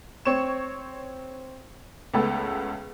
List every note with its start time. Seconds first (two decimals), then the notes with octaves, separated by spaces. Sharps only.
0.25 C4 C#5 C#6 E7
2.14 C#2 A3 B3 A4 B5